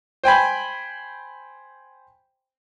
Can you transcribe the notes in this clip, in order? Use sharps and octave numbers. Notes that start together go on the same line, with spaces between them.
C5 G5 G#5 B5